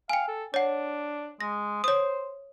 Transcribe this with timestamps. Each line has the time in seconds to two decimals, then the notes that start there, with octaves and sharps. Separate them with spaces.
0.10 F5 G5 G#5
0.28 A4
0.54 D4 C#5 F#5
1.41 G#3 A#6
1.84 C5 C#5 D#6